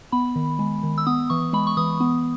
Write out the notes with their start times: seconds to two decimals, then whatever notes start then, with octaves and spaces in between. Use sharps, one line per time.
0.12 B3 B5
0.36 D#3
0.59 G#3
0.83 D#3
0.98 E6
1.07 B3 D#6
1.30 E3 C#6
1.53 G#3 B5
1.67 C#6
1.77 E3 D#6
2.00 B3